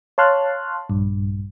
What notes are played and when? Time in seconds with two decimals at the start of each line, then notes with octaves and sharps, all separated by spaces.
0.18 C#5 F5 A5 C6 F6 F#6
0.89 A#1 G2